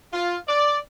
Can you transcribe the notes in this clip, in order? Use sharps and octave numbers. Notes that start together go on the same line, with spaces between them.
F4
D5